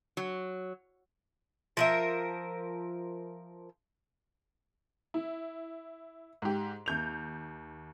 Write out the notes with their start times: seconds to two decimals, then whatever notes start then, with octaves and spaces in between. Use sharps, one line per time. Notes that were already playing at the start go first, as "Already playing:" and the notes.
0.17 F#3
1.77 F3 A#4 E5
5.14 E4
6.42 G#2 G4
6.86 D#2 G6 F7